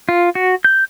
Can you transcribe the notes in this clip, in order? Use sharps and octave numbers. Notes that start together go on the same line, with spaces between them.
F4
F#4
G6